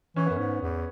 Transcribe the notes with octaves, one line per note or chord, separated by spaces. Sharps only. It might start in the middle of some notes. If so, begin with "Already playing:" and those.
E3 C#4
F#2 B3
G#2 C#4
E2